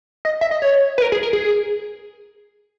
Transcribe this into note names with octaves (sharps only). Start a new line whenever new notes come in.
D#5
E5
D#5
C#5
B4
A#4
G#4
A#4
G#4